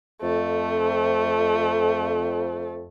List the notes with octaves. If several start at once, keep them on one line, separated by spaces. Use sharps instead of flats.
F2 A3